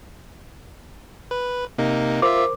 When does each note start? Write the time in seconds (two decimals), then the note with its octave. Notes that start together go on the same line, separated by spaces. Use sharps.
1.31 B4
1.78 C3 A#3 D#4
2.22 F4 A#4 C5 E5 D6